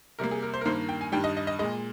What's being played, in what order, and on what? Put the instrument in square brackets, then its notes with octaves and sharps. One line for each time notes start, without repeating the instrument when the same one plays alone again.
[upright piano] C3 G3 A#3 A#4
G#4
A#4
C5
A#4
G2 D#3 A#3 C5
G5
G#5
G2 D#3 G3 G5
D#5
D#5
D#5
A#2 G#3 D#5